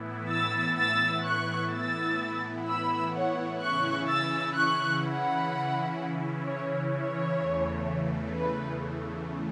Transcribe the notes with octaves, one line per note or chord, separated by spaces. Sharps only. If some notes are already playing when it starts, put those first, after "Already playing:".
Already playing: A2 E3 B3 E4
E6 A6
E6 A6
C#6 F#6
E6 A6
B5 E6
C#5 F#5
C#3 E3 C#4 E4 C#6 F#6
E6 A6
C#6 F#6
F#5 B5
C#5
C#5
E2 C#3 E3 A3
B4